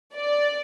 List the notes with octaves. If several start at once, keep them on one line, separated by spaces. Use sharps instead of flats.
D5